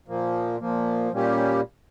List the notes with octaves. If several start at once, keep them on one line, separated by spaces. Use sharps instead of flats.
A#2 F3 A#3
A#2 F3 A#3
A#2 G3 A#3 C#4 G4